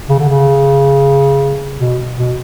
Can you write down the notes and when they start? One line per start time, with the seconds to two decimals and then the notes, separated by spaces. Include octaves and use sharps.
0.09 C#3
0.19 D3
0.29 C#3
1.78 B2
2.16 B2